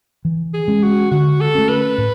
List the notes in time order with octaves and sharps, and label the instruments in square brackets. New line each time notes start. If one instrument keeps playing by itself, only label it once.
[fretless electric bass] E3
[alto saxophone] G#4
[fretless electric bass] G#3 C#4
[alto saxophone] F#4
[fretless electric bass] D3 [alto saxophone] F#4
[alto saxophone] A4
[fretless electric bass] A3 C#4
[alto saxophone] B4
[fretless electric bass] A2